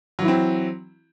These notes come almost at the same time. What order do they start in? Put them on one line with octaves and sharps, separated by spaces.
F#3 E3 E4 C4